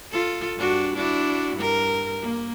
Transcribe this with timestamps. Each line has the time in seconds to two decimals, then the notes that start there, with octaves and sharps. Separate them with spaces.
0.11 F4 A4
0.57 G2 D4 F#4
0.95 D4 E4 F#4
1.56 G2 A#4
2.21 A#3